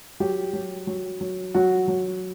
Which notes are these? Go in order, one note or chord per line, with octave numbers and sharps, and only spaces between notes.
F#3 G4
F#3
F#3
F#3
F#3 F#4
F#3